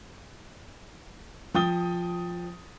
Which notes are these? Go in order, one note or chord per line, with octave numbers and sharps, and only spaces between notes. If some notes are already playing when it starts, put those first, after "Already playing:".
F3 G5 D#6 A6 G7